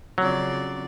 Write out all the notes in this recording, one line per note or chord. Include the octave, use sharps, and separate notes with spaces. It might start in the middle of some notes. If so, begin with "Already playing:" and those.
F2 C#3 F#3 D5